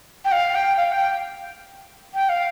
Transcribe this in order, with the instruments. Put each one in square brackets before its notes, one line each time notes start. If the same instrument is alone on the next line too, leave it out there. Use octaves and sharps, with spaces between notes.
[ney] G5
F5
G5
F5
G5
G5
F5